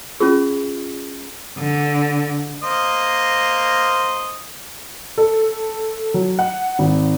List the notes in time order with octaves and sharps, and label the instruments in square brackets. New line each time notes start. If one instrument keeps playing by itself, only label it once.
[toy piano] C#4 F4 G#4
[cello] D3
[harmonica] A#3 C5 D#5
[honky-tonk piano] A4
F#3
F#5
G#1